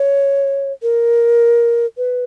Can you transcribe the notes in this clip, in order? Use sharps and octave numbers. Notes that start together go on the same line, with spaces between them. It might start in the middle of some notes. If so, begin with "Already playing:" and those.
Already playing: C#5
A#4
B4